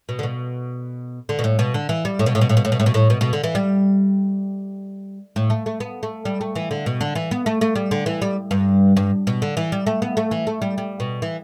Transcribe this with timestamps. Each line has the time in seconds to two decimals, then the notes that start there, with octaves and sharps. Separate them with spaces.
0.09 B2
0.19 D3
0.23 B2
1.29 D3
1.39 B2
1.44 A2
1.59 B2
1.74 D3
1.89 E3
2.05 G3
2.19 A2
2.26 B2
2.35 A2
2.41 B2
2.49 A2
2.57 B2
2.65 A2
2.72 B2
2.80 A2
2.86 B2
2.94 A2
3.10 B2
3.21 B2
3.33 D3
3.44 E3
3.55 G3
5.36 A2
5.50 A3
5.66 A3
5.80 B3
6.03 A3
6.25 G3
6.41 A3
6.55 E3
6.71 D3
6.86 B2
7.01 D3
7.15 E3
7.31 B3
7.46 A3
7.61 A3
7.76 G3
7.91 D3
8.06 E3
8.22 G3
8.51 G2
8.97 G2
9.27 B2
9.42 D3
9.57 E3
9.72 G3
9.87 A3
10.02 B3
10.17 A3
10.31 E3
10.47 A3
10.62 G3
10.78 G3
11.00 B2
11.22 E3